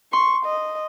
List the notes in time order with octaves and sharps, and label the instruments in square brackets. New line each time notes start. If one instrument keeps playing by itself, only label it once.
[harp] C6 [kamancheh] C#6
[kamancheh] D#5